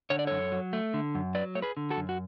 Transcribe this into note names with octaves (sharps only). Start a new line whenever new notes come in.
D3 C#5
D5
F#2 A4 C#5
F#3
A3
D3
F#2
F#3 B4 D5
A3 C#5
G#4 B4
D3
F#4 A4
F#2
F#4